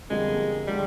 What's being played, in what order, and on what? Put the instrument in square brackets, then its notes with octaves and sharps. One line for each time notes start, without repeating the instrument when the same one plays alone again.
[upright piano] G1 F2 D3 G3 A#3 [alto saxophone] G#3
[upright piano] D3 F3 G#3 [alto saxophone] G3